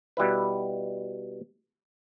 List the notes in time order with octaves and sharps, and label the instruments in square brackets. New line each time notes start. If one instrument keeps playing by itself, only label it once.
[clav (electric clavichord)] B2 G3 E4 B4